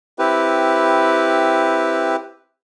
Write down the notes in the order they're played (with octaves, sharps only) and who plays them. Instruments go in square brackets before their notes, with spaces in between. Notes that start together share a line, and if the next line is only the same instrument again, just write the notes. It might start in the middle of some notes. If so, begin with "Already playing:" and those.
[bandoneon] C4 E4 G4 B4